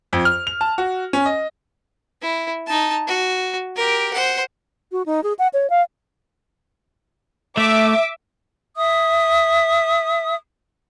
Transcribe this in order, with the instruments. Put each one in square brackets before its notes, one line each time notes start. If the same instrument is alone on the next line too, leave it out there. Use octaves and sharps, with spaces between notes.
[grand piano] F2
F6
F7
A5
F#4
C#4
D#5
[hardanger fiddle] E4
D#4 A5
F#4
G4 A#4
C5 F#5
[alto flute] F#4
D#4
G#4
F#5
C#5
F5
[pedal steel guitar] A3 [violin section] E5 D6
[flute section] E5 D#6